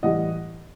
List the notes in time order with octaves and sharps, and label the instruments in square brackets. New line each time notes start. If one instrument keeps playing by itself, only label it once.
[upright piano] A2 E3 G3 D#5 F#5